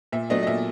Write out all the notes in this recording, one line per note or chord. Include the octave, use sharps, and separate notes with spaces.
A#2 E5
F#3 A3 D4 D#5
D#5
A#2 E5